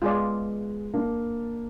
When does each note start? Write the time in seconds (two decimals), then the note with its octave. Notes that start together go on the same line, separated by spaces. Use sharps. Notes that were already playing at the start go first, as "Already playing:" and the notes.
0.02 G#3 B3 F4 G#4 D5
0.93 A#3 D4